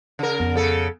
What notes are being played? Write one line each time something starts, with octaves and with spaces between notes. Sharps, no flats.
C#3 A#4
F2 B3
C#3 A4